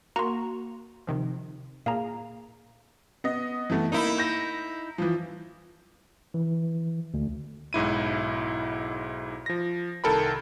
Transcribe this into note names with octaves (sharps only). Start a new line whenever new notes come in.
A#3 F#4 A#5 C6 C#6
C3 D#3 F3
A#2 A#3 G#4 F5 A#5
B3 D#5
E3 A3 B3
A#3 D#4 E4
G6 A#6
E3 F3
E3
D2
B1 G#2 E4 D#7
F3 A#6
C2 D#3 A4 A#4 B5